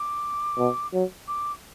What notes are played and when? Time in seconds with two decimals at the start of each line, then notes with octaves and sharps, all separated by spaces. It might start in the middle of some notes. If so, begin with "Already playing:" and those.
Already playing: D6
0.58 B2
0.93 F#3
1.28 D6